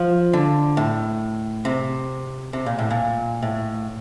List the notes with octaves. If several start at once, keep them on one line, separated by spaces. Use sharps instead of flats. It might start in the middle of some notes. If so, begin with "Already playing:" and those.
Already playing: F3
D3
A2
C3
C3
A#2
A2
A#2
A2